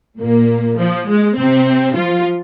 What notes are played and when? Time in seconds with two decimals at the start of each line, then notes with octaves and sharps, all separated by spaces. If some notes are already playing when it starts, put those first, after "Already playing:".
0.20 A#2 A#3
0.78 F3
1.08 G#3
1.37 C3 C4
1.96 F3 F4